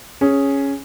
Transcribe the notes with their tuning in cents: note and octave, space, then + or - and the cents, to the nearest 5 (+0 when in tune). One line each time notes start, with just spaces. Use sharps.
C#4 +0 G#4 +0